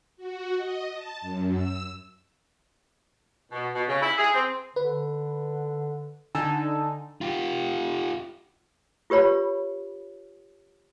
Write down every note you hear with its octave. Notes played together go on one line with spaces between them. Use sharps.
F#4
D#5
A5
F#2
E6
B2
B2
C#3
E4
G#4
C4
D3 B4
D3 D#4 G#5 A5 E6
F4 G4
F4 G4 B4 C#5 B5